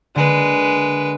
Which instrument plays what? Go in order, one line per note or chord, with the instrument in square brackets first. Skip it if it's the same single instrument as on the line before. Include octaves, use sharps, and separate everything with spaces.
[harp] D3 A#3 [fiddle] G#3 B4